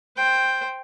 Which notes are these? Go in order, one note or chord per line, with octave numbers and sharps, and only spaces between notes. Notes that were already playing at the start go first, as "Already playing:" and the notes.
C5 G5